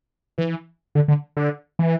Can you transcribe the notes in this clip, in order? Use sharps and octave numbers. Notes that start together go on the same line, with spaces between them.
E3
D3
D3
D3
E3